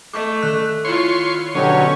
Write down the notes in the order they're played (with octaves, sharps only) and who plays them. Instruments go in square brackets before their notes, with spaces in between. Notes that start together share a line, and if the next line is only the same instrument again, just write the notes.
[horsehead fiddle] A3 [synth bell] D#5 C#6 D6
[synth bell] D#3 F#6
[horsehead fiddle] E4 F4 [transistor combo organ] C#5 C6
[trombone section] B2 D3 F#3 [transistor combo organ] C#4 [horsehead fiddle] G4 C#5